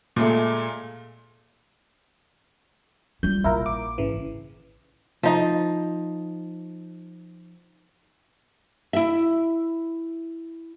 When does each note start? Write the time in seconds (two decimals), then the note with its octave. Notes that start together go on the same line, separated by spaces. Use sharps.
0.16 A#2 G#3 A3
3.23 G3 F4 G6
3.44 A#1 E4 F4 A#4
3.66 D6
3.98 G#1 C#3 E3
5.23 F3 D#4
8.93 E4 E5